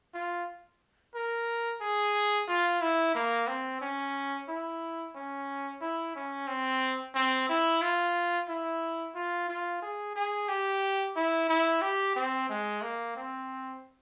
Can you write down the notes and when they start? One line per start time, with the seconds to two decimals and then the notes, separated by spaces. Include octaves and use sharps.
0.14 F4
1.15 A#4
1.81 G#4
2.48 F4
2.81 E4
3.15 A#3
3.47 C4
3.81 C#4
4.49 E4
5.15 C#4
5.81 E4
6.15 C#4
6.48 C4
7.15 C4
7.49 E4
7.82 F4
8.49 E4
9.15 F4
9.49 F4
9.82 G#4
10.15 G#4
10.48 G4
11.16 E4
11.49 E4
11.82 G4
12.16 C4
12.49 G#3
12.82 A#3
13.16 C4